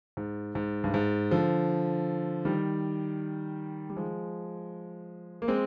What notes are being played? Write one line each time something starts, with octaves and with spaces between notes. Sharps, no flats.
G#2
G#2
G2
G#2
D3 F3
D#3 G3
G3
F3 G#3
A#3
G#3 C4